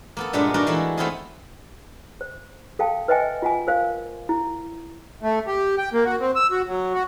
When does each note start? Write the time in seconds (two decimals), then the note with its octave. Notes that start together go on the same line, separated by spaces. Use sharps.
0.17 A#3 B3 A4
0.33 G2 A#2 G#3 A3 B3 D4
0.54 D4 D#4 F#4 A#4 D5
0.67 E3 G#3 A3 E4
0.97 A3 B3 C4 E4 F4 G#4
2.21 C5
2.79 A4 F5 G5 A5
3.08 B4 C5 D#5 E5 G5 G#5
3.42 F4 F#5 G#5
3.67 A#4 C5 F5
4.29 E4
5.22 A3
5.47 G4
5.78 G5
5.93 A#3
6.05 F#4
6.20 C4
6.36 E6
6.51 F#4
6.67 F#3
6.93 F#4